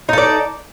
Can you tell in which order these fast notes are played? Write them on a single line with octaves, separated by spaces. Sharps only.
D#4 A4 D5